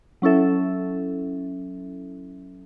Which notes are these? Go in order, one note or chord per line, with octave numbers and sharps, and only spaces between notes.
F#3 C#4 E4 A4 E5